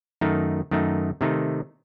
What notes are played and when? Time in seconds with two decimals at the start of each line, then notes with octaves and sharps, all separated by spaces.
0.21 F#2 D#3 A3 D#4
0.71 F#2 D#3 A3 D#4
1.21 C3 D#3 A3 D#4